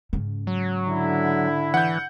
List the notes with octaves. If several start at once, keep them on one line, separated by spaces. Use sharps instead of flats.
G#2 C#3
F#3
D3 E4
E3 F#5 G6